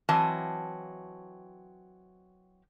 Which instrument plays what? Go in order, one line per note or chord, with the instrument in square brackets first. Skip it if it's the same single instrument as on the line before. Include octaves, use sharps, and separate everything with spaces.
[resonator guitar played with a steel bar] E3 F#3 C4 D#5 A5